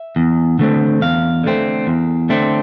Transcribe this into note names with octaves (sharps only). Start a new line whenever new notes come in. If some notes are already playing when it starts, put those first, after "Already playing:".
Already playing: E5
E2
D3 A3 C4
E2 F5
D3 A3 C4
E2
D3 A3 C4